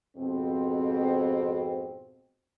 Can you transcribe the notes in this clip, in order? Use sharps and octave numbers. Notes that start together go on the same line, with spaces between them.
F2 G#2 B2 C4